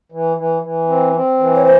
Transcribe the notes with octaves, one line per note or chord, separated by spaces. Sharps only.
E3
E3
E3
C4
C4
E3
C#5
C5